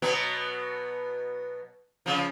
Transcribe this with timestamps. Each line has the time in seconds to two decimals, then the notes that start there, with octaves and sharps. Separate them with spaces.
0.02 B2 F#3 B3
2.06 C#3 F3